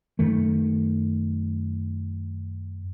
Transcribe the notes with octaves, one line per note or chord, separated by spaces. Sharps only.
F#2 D#3 A3